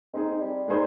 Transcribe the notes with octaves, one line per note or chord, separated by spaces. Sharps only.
G#3 C4 D#4 G#4
G3
G#3 D#4 G#4 C5